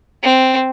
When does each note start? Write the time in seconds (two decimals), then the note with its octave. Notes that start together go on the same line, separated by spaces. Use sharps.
0.23 C4